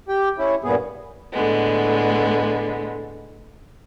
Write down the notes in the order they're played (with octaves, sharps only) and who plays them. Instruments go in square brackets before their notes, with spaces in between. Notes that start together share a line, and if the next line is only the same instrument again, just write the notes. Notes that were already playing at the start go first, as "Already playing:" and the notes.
[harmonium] G4 G5
C#4 E4
G2 A#2 B3 G#4
[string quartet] A2 D3 G#3 B3